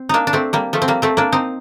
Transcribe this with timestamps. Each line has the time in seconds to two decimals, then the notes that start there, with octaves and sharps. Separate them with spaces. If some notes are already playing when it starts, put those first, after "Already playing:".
Already playing: C4
0.09 A#3 D4 D#4
0.27 D4
0.33 A3 C4
0.53 G3 A#3
0.73 F3 A3
0.82 C4
0.88 G3 A#3
1.02 A3 C4
1.17 A#3 D4
1.32 C4 D#4